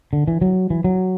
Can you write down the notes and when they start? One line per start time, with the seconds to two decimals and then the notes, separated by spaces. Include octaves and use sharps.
0.13 D3
0.28 E3
0.41 F#3
0.70 E3
0.84 F#3